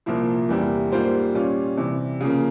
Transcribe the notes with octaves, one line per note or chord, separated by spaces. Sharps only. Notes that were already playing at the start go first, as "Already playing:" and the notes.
C2 A#2 F3 A#3 E4
E2 C3 G3 A#3 E4
G#2 G3 A#3 F4 C5
A#2 G3 C#4 F4
C3 E3 G3
C#3 F3 A#3